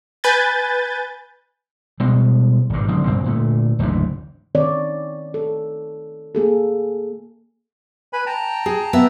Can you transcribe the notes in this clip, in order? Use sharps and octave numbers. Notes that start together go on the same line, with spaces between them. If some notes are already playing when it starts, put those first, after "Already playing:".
B4 G#5 G6 A6
B2 G3 G#3
G#1 G2
D3 F#3 G#3 C4
G2 C#3 G3 C4
A#2 D3 A3
F#1 D2 G#2 E3
D#3 C4 C#5 D5
A4
A#3 G#4 A4
B4 G#5 B5
G5 A5 A#5
G#4
B3 E5